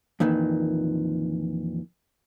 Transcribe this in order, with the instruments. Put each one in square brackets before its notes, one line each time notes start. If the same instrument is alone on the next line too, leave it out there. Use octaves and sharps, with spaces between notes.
[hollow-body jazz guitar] F2 A#2 D#3 E3